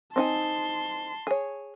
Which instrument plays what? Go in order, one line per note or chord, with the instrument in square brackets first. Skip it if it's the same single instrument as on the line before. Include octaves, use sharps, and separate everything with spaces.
[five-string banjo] C4 D#4 G#5 [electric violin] A5 C6
[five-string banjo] G#4 C#5